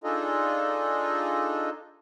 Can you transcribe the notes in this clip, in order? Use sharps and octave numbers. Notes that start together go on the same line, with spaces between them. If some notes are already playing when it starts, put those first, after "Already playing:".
D4 D#4 F4 G#4 A4 D#5